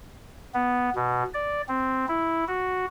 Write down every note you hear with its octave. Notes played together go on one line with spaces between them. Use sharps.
B3
B2
D5
C4
E4
F#4